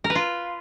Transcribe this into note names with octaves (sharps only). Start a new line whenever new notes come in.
A#4
B4
F4